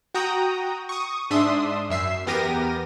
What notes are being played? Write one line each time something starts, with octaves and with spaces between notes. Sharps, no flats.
F#4 G5 A#5 D#6
C#6 D#6
G#2 D4 E5 C6 D#6
F#2 E5 C7
E2 B3 G4 A#4 A#6 D#7